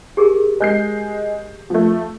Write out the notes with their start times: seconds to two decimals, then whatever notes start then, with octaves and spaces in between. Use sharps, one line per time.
0.17 G4 G#4 A#4
0.60 G#3 G6 C7
1.70 F3 A3